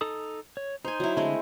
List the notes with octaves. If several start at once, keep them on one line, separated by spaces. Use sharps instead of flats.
D#4 A4 D#6
C#5
D#4 C5 G#5
F#3 E4
D3 G#3 A3 C4 C6